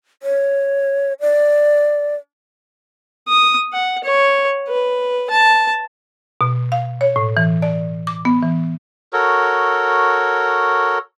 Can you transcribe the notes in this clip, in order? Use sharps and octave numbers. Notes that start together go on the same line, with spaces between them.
C#5
D5
D#6
F#5
C#5
B4
A5
B2
F5
C#5
A2
E3
D5
D6
B3
E3
F#4 A4 A#4 C#5